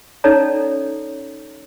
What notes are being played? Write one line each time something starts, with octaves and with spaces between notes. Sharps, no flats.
C#4 D#4 A4 C#5 D5 A#5